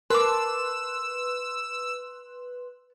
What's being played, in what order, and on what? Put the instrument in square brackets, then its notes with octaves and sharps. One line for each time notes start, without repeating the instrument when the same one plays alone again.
[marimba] A#4 [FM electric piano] B4 C6 F#6 [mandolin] A5 D6 [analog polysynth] E6